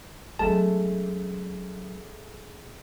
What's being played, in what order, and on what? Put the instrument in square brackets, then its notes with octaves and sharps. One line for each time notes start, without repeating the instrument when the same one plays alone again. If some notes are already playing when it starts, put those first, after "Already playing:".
[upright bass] F#3 C#4 [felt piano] G#3 A3 [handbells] A5